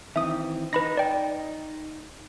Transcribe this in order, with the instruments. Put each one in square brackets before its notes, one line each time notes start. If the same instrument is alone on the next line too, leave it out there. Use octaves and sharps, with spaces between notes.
[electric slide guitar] D#3 E3 C4 [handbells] E5 D#6
[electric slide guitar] D#4 [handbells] B4 B5 A#6
[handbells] D5 G5